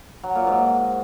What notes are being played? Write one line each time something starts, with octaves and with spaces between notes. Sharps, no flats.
F#3
A#2
G#2